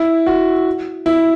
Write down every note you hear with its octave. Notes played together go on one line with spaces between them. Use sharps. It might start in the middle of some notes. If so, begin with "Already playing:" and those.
Already playing: E4
F#4
E4